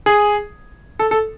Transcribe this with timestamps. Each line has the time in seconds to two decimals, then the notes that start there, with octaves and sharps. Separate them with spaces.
0.06 G#4
0.99 A4
1.11 A4